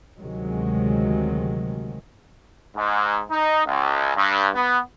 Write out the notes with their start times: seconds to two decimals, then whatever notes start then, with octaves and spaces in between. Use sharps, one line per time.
0.21 D2 C3 D#3 F#3 G#3
2.76 G#2
3.31 D#4
3.66 C#2
4.16 G2
4.55 B3